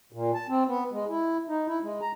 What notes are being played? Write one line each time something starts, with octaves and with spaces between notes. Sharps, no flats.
A#2
A5
C4
B3
G#3
E4
D#4
E4
G#3
A#5